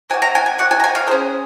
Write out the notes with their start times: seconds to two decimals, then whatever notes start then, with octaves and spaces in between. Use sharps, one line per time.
0.10 C4 G#5
0.14 F#4
0.22 A#5
0.35 G#5
0.46 G#5
0.58 C4 F#4 F#5
0.71 G#5
0.80 A#5
0.84 G#5
0.95 F5
1.07 G#4 C5
1.11 C#4